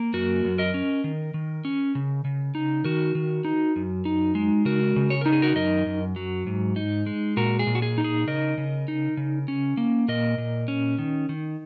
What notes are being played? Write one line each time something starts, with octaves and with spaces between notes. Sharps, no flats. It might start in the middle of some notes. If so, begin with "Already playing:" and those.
Already playing: A#3
F#2 F#4 A#4
F#2
A#4 D#5
C#4
D#3
D#3
C#4
C#3
C#3
D#4
D#3 F#4 A#4
D#3
D#4
F#2
D#4
G#3
C#3 F#4 A#4
C#3
C#5
D#4 A#4
G#4
F#4 A#4
F#2 A#4 D#5
F#2
F#3
G#2
D#4
G#3
A#2 F#4 A#4
G#4
A#2
F#4
G#4
D#4
G#4
C#3 A#4 D#5
C#3
D#4
C#3
C#4
A#3
A#2 A#4 D#5
A#2
C#4
D#3
D#3